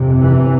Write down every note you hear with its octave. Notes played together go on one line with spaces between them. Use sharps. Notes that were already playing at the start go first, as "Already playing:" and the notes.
Already playing: G1 F2 C3
E3